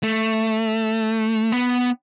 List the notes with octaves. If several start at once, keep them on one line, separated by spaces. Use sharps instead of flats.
A3
B3